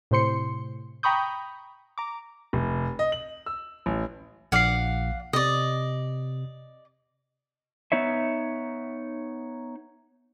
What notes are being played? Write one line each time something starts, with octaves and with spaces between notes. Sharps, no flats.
A2 C3 C5 C6 C#7
G5 A#5 B5 C#6 D#6 G6
A#5 D6
F1
D#5
F#7
E6
A1
A#1 D5 F5 F#5 C7
C3 D5 D#5
B3 D#4 C#5 E5